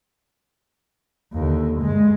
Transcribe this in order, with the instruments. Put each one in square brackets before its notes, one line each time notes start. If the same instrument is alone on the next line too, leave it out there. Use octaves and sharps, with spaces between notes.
[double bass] D#2 D3
G2 G#3